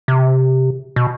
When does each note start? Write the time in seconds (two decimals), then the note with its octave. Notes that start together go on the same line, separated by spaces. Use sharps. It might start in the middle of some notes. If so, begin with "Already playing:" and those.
0.08 C3
0.96 B2